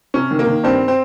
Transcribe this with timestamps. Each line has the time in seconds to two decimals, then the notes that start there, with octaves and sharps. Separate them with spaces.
0.14 C3 C#4
0.31 D#3
0.39 A#3
0.47 D#3
0.64 G2 C4
0.88 C4